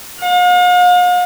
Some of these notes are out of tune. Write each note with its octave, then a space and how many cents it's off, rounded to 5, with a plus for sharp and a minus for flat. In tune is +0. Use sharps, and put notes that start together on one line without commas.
F5 +45